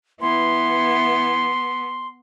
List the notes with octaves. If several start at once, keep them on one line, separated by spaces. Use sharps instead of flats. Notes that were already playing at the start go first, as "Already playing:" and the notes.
E3 B3 E4 C6